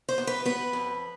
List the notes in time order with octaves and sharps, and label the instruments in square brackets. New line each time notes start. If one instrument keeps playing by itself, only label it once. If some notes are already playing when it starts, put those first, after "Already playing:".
[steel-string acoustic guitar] C5
B3
B4
B3 B4
F2